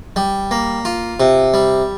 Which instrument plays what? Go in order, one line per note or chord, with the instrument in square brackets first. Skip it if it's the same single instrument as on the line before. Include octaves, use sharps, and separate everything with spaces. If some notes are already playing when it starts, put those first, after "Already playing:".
[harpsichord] G3
A#3
F4
C3
G3